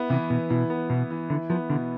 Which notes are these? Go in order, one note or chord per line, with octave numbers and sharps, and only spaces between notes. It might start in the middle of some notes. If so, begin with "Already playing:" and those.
Already playing: B3 E4
C3 E3
B2 E3
B2 E4
B3
B2 E3
E3
D3 E4
F3 B3
B2 D3